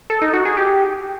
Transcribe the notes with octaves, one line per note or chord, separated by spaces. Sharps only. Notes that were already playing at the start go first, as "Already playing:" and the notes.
A4
D#4
F#4
G#4
G4